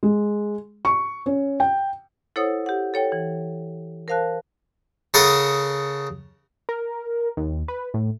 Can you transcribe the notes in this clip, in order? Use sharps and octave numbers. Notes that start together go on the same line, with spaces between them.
G#3
C#6
C#4
G5
E4 A4 C5 C#5 F#5 D#6
G4 F#5
A4 C#5 G5
E3
A#4 C5 F5 A5 F#6
C#3 A4 A#4 F#5 A5 D#6
A#4
D#2
B4
A2